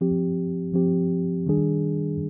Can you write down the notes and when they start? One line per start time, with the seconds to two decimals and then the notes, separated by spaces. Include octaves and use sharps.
0.01 F3 C4 G4
0.74 F3 C4 G4
1.46 D#3 G3 D4 G#4